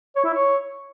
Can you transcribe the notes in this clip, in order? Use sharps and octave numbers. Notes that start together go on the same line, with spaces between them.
C#5
E4
C#5